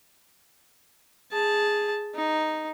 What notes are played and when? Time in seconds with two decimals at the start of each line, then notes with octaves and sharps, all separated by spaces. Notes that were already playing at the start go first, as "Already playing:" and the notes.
1.32 G#4 A5
2.15 D#4